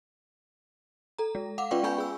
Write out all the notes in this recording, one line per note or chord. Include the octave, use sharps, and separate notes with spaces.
A4 A#5
G#3
F5 F#5 D6
C#4 F4 B4 D5 G5 C#6
B3 F4 G#5 B5 C#6 G6
G#4 E6